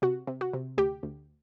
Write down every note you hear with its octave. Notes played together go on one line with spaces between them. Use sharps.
C3 F#4
C3
F#4
C3
D2 G4
D2